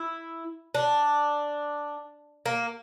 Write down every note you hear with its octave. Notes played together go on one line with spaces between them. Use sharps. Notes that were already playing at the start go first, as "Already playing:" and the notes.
Already playing: E4
D4
A#3